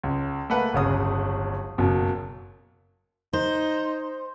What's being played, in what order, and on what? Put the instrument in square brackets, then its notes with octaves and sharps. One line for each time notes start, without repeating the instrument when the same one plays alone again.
[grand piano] C#2
A3 A#3 B4 F#5
D1 G1 C#3 D#6
F#1 B2
[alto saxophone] D#4 [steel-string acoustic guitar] C5